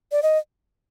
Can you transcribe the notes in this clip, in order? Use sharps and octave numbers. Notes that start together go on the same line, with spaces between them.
D5
D#5